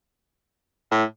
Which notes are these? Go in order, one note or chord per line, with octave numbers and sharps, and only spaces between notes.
A2